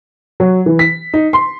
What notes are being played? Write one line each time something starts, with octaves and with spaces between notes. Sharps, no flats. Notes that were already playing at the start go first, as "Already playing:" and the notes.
F#3
E3
B6
D#4
C6